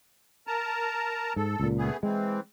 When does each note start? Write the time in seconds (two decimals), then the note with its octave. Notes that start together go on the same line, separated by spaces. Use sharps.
0.47 A#4 A5 A#5
1.36 G#2 A4
1.60 C#2 A#2
1.78 A3 B3 G#4
2.03 E3 G#3 C4